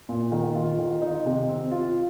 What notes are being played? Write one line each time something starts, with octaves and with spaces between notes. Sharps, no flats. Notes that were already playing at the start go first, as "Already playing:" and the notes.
A#2
D#3
F4
D#3
D#4
C3
C4
F4